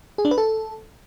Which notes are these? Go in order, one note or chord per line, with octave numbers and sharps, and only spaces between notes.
G#4
D4
B4
A4